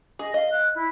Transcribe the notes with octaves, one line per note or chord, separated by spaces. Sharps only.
G#4 D#5
D#5 F5
F#6
E4